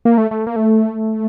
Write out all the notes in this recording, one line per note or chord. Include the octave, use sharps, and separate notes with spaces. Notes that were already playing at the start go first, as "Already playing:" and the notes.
A#3
A3
A3
A#3
A3